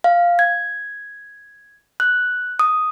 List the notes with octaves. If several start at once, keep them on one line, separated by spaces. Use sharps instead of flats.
F5
G#6
F#6
D#6